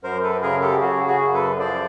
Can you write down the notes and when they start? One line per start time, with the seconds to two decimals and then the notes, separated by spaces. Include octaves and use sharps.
0.03 F#2 A#4 C5
0.23 A4 B4
0.42 C#3 G#4 A#4
0.62 G4 A4
0.81 C#3 F#4 G#4
1.07 F#4 G#4
1.21 F#2
1.34 A4 B4
1.59 F3 C5 D5